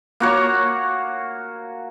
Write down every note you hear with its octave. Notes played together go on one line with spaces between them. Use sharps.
A#3 F#4 C#5